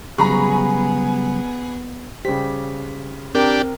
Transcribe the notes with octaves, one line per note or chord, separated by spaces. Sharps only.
C#3 F#3 G3 B3 G#4 A#5 B5 C#6
C#3 G3 G4 C5 B6
C4 D4 G4 A#4